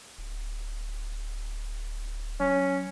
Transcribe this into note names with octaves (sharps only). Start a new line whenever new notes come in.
D1
F#3 C#4